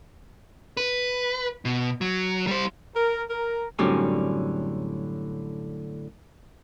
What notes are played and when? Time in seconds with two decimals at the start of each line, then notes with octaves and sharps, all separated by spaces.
0.77 B4
1.65 B2
2.01 F#3
2.47 G3 C5
2.96 A#4
3.30 A#4
3.79 F#2 A2 D3 G3 C4 C#4